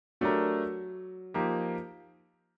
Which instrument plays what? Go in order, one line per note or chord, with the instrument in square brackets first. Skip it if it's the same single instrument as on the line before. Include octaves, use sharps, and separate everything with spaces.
[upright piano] F#3 [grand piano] A3 D4 G4 A#4
[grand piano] F3 A#3 D#4 G4